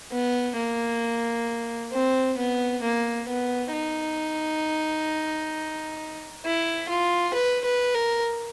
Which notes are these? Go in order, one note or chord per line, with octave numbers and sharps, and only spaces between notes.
B3
A#3
C4
B3
A#3
B3
D#4
E4
F4
B4
B4
A#4